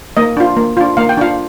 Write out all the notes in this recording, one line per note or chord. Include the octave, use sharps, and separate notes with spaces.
A#3 D#5
D4 F4
A#3
D4 F4
A#3 F5
G5
D4 F4 F5